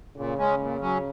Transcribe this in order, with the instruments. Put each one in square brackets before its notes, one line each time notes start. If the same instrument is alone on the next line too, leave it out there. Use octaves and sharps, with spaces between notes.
[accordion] A#2 [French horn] C#3
[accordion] G#3 C#4
A#2
F#3 C#4